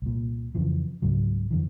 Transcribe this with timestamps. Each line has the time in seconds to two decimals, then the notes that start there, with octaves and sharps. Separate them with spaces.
0.02 C2 A#2
0.55 F2 C#3 E3 F3
1.02 C#2 G#2 C#3 F#3
1.51 F2 D3 E3